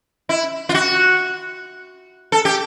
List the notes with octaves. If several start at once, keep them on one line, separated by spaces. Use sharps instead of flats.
E4
F4
F#4
A4
G4